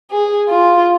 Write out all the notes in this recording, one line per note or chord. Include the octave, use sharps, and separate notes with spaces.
G#4
F4